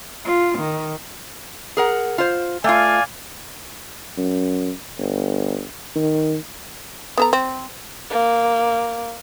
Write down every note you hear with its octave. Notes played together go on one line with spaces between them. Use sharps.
F4
D#3
G#4 A#4 F#5
F4 C5
A3 F4 D5 F5 G#5
F#2
G1
D#3
B3 A4 A#5
C4
A#3